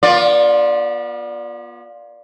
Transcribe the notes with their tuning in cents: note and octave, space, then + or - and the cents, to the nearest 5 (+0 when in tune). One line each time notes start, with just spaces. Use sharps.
B3 -35 F4 +15 D5 +0